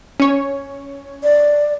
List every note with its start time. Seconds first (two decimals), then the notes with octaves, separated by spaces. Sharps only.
0.20 C#4 C#5
1.23 D5